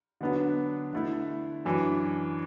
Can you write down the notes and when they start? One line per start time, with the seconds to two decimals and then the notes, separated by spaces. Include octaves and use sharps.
0.21 D3 F#3 B3 D4
0.93 D3 A3 E4
1.65 F#2 E3 D4